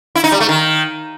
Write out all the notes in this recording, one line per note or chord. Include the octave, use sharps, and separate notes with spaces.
E4
D#4
G3
A3
D#3